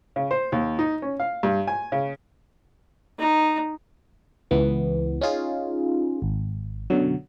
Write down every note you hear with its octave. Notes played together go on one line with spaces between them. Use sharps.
C#3
C5
D#2
D#4
C#4
F5
G2
G#5
C#3
D#4
C#2 E3 B3
C#4 D#4 F4 G#4
G#1
F#2 B2 D3 F#3